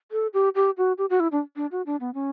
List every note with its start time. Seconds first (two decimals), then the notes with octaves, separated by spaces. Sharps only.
0.12 A4
0.34 G4
0.55 G4
0.77 F#4
0.98 G4
1.10 F#4
1.20 E4
1.32 D4
1.56 D4
1.72 F#4
1.86 D4
2.00 B3
2.14 C#4